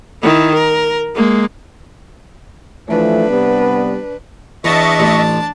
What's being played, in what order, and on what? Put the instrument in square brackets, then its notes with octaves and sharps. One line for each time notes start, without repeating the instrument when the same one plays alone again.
[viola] D#3 E4
A#4
G#3 A#3
[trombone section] E3 F3 A3 [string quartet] D4 B4
[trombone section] C3 G3 B3
[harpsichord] E2 [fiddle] D4 A5 [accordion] D#5 E5 C#6
[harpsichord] A1